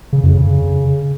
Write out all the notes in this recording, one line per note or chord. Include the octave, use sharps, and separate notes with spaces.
C#3
F2
C#3